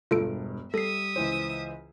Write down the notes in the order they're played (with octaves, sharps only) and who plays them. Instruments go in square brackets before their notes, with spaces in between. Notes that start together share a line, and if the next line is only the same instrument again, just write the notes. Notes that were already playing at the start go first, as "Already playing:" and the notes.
[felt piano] E1 G2 [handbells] F4 A4 D7
[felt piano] G3 [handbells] A4 C7 [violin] E5 D#6
[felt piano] C#2 E3 C5